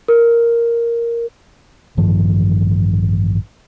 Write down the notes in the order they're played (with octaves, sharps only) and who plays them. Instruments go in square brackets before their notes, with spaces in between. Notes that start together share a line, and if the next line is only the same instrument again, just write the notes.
[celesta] A#4
[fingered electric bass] A1 G2 D#3 F3